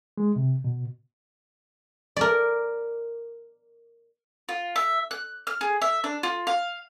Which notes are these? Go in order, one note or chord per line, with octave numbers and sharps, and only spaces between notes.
G#3
C3
B2
A#4 D5
F4
E5
F#6
F6
G#4
E5
D4
F4
F5